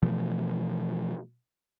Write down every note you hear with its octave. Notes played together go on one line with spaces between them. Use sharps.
B2 E3 F3 A3